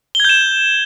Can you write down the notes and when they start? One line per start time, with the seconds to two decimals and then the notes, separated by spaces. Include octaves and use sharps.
0.15 G7
0.20 G#6
0.25 G6
0.29 E7